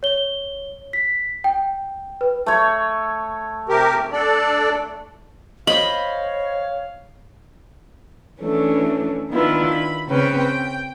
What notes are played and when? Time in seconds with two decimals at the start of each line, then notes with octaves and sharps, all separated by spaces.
0.03 C#5 G7
0.93 B6
1.44 G5
2.21 B4
2.46 A3 C#5
3.69 C3 G4 A#4
4.12 D4 A4 D5
5.67 C5 C#5 D#5 F5 B5
8.42 E3 A3 C#4 D4
9.31 D#3 B3 D4 E4 F4 B4
9.70 B5
10.09 C#3 C4 C#4 B4 G5
10.38 G5